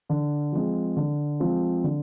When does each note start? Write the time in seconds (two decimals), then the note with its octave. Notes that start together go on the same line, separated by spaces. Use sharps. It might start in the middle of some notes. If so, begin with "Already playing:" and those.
0.09 D3
0.52 F3 G#3 C4
0.97 D3
1.40 F3 G#3 C4
1.84 D3